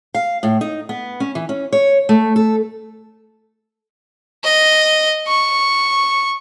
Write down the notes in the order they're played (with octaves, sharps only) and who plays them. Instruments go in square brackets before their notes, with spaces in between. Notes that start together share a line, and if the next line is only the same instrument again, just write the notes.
[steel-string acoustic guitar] F5
A2
D#4
B3
C#4
E3
C#4
C#5
A3
A4
[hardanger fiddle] D#5
C#6